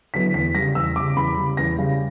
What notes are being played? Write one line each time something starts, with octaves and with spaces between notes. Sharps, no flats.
D3 F#3 B3 E4 B6
E2 B6
C#3 G3 A#6
E2 E6
C#3 G3 D6
E2 B5
C#3 G3
E2 A#6
C#3 G3